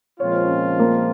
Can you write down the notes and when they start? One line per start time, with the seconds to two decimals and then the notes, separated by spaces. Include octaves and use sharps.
0.20 A#2 F3 G#3 C4 F4 C#5
0.32 C5
0.45 C#4 C#5
0.79 A#3 A#4